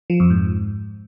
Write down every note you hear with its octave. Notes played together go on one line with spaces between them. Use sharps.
F3
F2
G#2